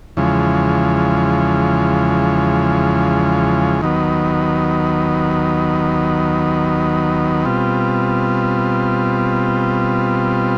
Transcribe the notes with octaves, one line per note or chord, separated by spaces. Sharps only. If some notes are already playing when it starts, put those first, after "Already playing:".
E2 C#3 F3 G#3
D#2 D#3 F#3 B3
B2 G3 C4 F4